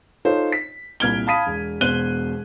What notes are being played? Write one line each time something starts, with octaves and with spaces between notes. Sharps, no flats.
D#4 F4 A4 C5 C#5
B6
C2 A#2 F6 G#6 D7 G7
F5 A5 B5 D#6 B6 D#7
E1
E1 B2 C5 F#6 D#7 G7